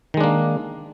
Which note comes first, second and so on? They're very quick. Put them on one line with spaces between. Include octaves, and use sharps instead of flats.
D#3 G#3 D4 A#3